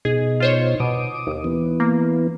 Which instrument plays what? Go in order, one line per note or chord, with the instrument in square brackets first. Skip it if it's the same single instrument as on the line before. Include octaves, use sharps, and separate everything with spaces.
[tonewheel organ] B2 D#4 [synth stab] G#4
[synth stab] F4 C5 C#5
[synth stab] B2 [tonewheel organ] D6 D#6
[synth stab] D#2
[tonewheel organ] E3 B3
[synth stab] A#3